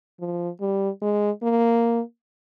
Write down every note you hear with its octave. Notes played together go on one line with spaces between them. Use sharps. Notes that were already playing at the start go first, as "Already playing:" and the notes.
F3
G3
G#3
A#3